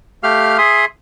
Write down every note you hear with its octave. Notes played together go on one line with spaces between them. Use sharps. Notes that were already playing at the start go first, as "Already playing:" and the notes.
A3 G4 F5 F6
G#4 E5 C6 D#6